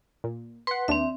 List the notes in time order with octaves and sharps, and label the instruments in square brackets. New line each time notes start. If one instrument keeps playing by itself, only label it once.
[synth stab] A#2
[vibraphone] B4 [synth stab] F#5 C6
[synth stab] D#2 D4 [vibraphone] C4 E5